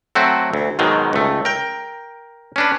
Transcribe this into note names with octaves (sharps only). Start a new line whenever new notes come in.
F#3 A3 C4 F#4
D2
G#2 B2 D#3 F#3
C#2 A3
A#4 G5
C#4 D4 B4